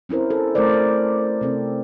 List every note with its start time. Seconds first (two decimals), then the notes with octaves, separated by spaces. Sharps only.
0.09 C4 C#4 E4 A#4 C5
0.30 A4
0.55 A3 A4 A#4 C5 D5
1.41 C3 C4 A4